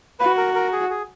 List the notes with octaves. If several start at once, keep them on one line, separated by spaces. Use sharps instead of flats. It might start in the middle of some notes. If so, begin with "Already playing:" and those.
F#4 B4
A#4
A#4
G#4
G#4